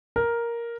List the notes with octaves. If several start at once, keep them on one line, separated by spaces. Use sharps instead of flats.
A#4